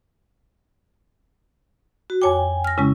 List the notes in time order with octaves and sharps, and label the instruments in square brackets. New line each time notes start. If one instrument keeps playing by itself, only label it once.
[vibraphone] F#4
[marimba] F2 C#5 D6 [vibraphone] G5 G#5
[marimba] F6 A#6
[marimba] C#3 G#3 C#4 [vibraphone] E4